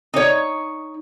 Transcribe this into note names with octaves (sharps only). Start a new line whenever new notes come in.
D#4 C#5